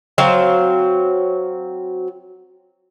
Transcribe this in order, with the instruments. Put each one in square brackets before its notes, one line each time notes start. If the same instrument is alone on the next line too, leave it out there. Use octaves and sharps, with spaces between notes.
[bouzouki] F#3 C4 F5